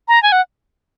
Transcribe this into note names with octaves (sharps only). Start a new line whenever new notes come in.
A#5
G#5
F#5